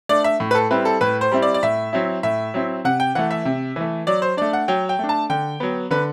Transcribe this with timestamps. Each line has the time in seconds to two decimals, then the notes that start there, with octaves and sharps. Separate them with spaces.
0.09 A3 D4 D5
0.24 E5
0.40 A2
0.51 B4
0.55 A4
0.71 G3 C4 E4 B4
0.85 A4
1.01 A2 B4
1.21 C5
1.32 G3 C4 E4
1.42 D5
1.54 D5
1.63 A2 E5
1.93 F#3 C4 E4
2.23 A2 E5
2.54 F#3 C4 E4
2.85 C3 F#5
3.00 G5
3.15 E3 A3 F#5
3.31 E5
3.45 C3
3.76 E3 A3
4.07 F#3 D5
4.22 C5
4.37 A3 D4 D5
4.53 F#5
4.68 F#3 G5
4.89 G5
4.99 A3 D4
5.09 A5
5.30 D3 G5
5.60 F#3 B3
5.91 D3 B4